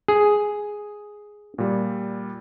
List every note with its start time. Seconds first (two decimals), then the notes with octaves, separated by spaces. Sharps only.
0.08 G#4
1.58 A#2 G3